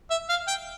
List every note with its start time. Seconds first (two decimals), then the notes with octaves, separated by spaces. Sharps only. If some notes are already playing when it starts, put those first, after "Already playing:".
0.10 E5
0.29 F5
0.48 G5